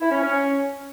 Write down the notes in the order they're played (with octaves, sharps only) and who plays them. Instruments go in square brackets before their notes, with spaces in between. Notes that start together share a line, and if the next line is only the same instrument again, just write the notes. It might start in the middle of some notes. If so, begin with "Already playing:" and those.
[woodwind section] E4
C#4
C#4